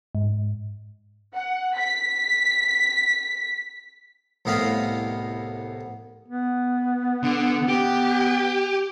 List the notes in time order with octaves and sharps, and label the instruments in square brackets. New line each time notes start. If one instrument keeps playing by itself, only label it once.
[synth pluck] G#2
[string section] F#5
B6
[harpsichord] C2 A2 B3 D#5 F5 B5
[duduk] B3
[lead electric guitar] D3
[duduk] B3 [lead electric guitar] G4